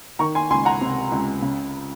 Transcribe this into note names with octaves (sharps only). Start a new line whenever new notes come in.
D#3 A#5 C#6
G#5 C6
C#2 G#5 C6
F#5 A#5
C3
C#2
C#3